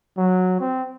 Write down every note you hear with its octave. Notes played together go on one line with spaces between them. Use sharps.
F#3
C4